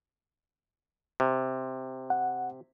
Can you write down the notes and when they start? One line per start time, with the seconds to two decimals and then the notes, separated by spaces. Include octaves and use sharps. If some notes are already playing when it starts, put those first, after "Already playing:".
1.20 C3
2.10 F#5